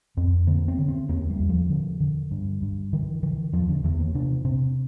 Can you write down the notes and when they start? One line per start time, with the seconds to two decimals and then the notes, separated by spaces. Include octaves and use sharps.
0.17 F2 C4
0.47 D3 A#3
0.68 C4
0.78 D3
0.88 C4
1.09 E2 A#3
1.30 G3
1.40 E2
1.49 F3
1.69 D3
2.00 D3
2.31 G2
2.62 G2
2.93 D3 E3
3.23 D3 E3
3.53 E2 F3
3.69 D3
3.84 E2 E3
3.99 A#3
4.15 C3 D4
4.45 C3 C4